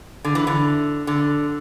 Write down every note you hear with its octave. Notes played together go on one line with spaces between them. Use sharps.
D3
E3
D3
D3